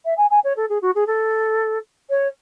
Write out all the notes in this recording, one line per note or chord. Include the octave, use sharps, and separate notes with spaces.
E5
G#5
G#5
C#5
A4
G#4
F#4
G#4
A4
C#5